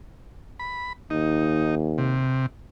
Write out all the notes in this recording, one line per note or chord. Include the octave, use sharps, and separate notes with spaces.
B5
D#2 D#4
C3